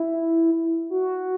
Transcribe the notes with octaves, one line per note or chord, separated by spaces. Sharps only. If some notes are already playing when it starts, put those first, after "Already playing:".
Already playing: E4
F#4